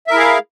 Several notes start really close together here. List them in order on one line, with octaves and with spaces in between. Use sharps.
E5 A#4 E4 G#4 F5